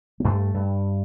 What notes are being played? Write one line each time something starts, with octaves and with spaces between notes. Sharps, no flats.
A#3
G2 A3
G2